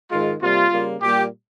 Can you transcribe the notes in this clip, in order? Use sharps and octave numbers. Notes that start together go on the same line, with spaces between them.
G#2 D#3 G#3 F4
C3 G3 A#3 F4
C#3 G3 A#3
A#2 G3 A#3 G4